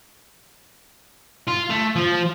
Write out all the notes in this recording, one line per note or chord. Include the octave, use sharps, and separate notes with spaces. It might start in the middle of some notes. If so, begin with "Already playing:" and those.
F4
A3
F3